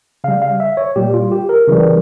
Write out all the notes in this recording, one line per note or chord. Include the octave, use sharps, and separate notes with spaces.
C#3 G3 F5
F5
E5
C#5
A#2 G3 G4
F4
G4
A#4
C#3 E3 G3